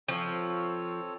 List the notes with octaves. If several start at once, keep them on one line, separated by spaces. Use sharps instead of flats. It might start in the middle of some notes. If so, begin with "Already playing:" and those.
F3 C4 A4 C#5